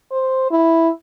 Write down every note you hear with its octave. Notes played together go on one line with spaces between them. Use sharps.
C5
E4